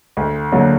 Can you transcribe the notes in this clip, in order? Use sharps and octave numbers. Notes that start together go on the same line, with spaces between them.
D2
D3 F#3 A#3